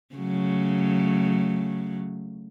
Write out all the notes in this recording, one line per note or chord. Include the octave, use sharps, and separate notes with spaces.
C#3 F#3 A3